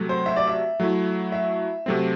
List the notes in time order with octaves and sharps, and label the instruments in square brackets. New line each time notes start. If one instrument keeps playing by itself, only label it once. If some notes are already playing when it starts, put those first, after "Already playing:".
Already playing: [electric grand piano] C3 F#3 A3
[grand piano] C5
E5
D5
E5
[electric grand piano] F#3 A3 E4
[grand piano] E5
[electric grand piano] C3 F#3 A3 C4